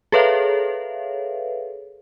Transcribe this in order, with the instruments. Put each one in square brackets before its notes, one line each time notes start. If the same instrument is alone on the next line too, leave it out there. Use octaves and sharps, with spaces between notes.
[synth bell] G#4 A4 B4 C#5 E5 F5